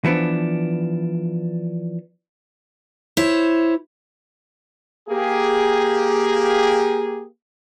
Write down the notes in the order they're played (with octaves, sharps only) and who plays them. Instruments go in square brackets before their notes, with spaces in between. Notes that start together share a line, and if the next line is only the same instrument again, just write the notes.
[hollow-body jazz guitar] E3 F3 B3 D4
[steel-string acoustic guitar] E4 C5 C#5
[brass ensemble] A#3 G4 G#4